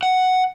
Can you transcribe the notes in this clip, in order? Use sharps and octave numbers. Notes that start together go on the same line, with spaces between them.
F#5